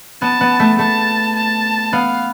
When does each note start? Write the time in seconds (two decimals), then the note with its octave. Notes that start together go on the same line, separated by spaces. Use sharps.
0.22 B3 A5
0.41 B3
0.60 A3
0.79 A3 A5
1.36 A5
1.93 B3 F5